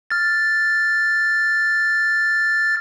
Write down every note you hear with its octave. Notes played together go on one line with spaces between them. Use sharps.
F6 A6